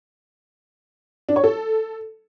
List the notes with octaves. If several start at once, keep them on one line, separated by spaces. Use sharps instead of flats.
D4
C#5
A4